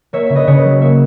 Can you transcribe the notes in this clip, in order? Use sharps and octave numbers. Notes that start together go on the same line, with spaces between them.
A#3 C#5 E5
C#3 E5
B4 D#5
C#3 C#5
B4
F#3
A#3 C#5 E5